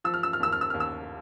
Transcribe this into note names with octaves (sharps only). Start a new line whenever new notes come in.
F3 E6
F6
E6
F6
D#2 E6
F6
E6
D#2 F6
E6